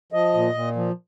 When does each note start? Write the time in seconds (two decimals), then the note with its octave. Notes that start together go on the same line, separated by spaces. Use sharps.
0.12 F3 D#5
0.34 A#2
0.54 A#2
0.76 F3